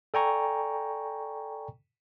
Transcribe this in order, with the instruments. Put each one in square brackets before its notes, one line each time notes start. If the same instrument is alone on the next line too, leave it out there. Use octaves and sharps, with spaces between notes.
[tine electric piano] A4 D5 G5 G#5 A#5 C#6